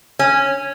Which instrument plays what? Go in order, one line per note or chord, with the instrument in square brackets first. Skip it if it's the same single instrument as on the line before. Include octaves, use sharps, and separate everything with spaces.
[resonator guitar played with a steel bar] C#4